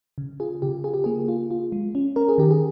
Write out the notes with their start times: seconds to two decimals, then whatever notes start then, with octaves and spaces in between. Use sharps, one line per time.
0.18 C#3
0.40 F4 G#4
0.62 C#3 G4
0.84 F4 G#4
0.94 G4
1.04 A#3 G#4
1.28 F4
1.51 F4
1.72 G#3
1.95 C#4
2.16 C#4 A#4
2.29 G#4
2.38 D#3 G4
2.51 G#4